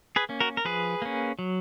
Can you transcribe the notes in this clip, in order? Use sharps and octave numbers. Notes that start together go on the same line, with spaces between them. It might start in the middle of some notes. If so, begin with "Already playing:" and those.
G#4 B4
A#3 C#4
F#4 A#4
A#4
F3 G#4 B4
A#3 C#4
F#3